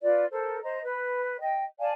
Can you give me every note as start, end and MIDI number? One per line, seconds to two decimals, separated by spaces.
0.01 0.25 65
0.01 0.25 71
0.01 0.25 74
0.31 0.58 69
0.31 0.58 70
0.31 0.58 72
0.62 0.80 72
0.62 0.80 75
0.62 0.80 82
0.82 1.38 71
1.39 1.63 75
1.39 1.63 79
1.79 1.90 74
1.79 1.90 77
1.79 1.90 80
1.79 1.90 81